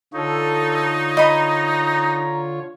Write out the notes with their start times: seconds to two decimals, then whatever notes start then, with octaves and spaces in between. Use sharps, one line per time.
0.14 D3 D#4 F4 A4 C#5
1.17 D#5 A#5 B5